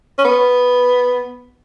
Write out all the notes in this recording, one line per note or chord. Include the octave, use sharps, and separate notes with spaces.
C#4
B3